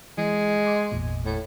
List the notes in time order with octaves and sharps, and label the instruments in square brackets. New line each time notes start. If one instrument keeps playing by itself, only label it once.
[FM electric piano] E3 [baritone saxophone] G#3
[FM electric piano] C6 D6
G#1 E2 A#2
[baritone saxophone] A2